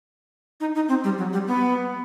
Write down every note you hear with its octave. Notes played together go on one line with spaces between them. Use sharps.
D#4
D#4
C4
G3
F#3
G3
B3